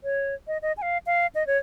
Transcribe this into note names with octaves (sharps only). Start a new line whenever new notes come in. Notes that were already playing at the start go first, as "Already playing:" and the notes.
C#5
D#5
D#5
G#5
F5
F5
D#5
C#5